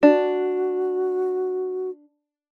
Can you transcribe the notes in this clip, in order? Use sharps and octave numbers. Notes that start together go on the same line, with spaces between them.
D4 F#4